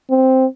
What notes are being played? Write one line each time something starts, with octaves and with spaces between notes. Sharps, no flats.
C4